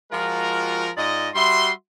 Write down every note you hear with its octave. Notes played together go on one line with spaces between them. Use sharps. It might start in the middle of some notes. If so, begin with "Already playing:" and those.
F3 G#3 F4 F#4 A#4
G#2 F4 D5 D#5
G3 F#4 E5 C6